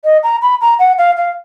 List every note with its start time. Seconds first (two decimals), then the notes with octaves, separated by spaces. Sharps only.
0.04 D#5
0.23 A#5
0.42 B5
0.61 A#5
0.79 F#5
0.98 F5
1.17 F5